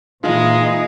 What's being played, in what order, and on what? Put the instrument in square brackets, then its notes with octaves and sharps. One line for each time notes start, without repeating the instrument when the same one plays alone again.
[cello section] A#2 E3 [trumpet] G#3 [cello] D#4 [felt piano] F4